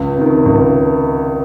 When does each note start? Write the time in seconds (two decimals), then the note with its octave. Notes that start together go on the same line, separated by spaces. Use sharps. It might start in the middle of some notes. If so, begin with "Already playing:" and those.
Already playing: C#2
0.17 C3 D#3
0.46 C#2